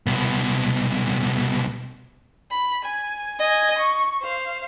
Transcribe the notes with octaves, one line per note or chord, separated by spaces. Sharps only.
C2 B2
B5
G#5
D#5 G#5
C#6
C5 F5